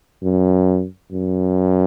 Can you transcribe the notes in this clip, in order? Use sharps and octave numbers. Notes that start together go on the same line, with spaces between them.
F#2
F#2